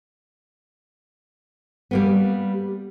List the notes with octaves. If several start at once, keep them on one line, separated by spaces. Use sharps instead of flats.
G3 A#3 B3